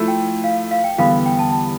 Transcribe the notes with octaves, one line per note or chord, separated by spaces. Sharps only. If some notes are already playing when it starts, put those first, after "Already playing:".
Already playing: F3 A3 E4 A4
G5
F5
F5
G5
E2 D3 G3 B3 F5
G5
A5
A5